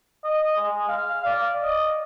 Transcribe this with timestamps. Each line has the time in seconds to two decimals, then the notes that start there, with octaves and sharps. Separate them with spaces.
0.24 D#5
0.57 G#3
0.88 F5
1.25 D5
1.63 D#5